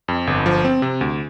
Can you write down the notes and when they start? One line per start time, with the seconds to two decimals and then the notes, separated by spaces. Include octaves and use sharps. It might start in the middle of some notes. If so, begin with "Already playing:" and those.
0.08 F2
0.27 G1
0.46 F3
0.64 C4
0.82 C3
1.01 D2